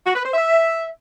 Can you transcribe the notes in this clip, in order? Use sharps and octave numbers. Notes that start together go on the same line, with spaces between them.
F#4
B4
C5
E5